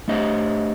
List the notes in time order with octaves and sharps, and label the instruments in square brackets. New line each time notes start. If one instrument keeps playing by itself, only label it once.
[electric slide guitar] A3 D4 G4 C5 D#5